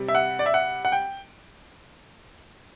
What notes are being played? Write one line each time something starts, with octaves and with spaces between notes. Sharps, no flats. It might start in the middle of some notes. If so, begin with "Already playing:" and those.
Already playing: C3 G3
E5
F#5
D5
E5
F#5
F#5
G5